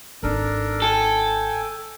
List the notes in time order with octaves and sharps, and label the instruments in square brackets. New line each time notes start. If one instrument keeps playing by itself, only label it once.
[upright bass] G#1 D#4 [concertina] D4 A4 A#4
[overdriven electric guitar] A4 [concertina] G5 G#5